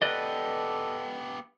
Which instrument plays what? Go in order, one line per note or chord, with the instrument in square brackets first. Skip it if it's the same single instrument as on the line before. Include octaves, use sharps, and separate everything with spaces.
[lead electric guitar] B3 G4 [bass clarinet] A4 [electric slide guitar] B4 D5 D#5